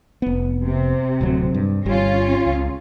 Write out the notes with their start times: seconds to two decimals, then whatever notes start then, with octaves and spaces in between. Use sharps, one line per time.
0.22 F1 B3
0.65 C3
1.21 D1 D2 F#3
1.54 G2
1.86 G1 G3 C#4 F4
2.46 C#2